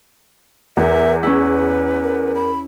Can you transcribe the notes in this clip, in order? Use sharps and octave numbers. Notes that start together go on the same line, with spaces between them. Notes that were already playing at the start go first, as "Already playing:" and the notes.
E2 A#4 E5
C#4 E4 G#4 B4
A#4
B5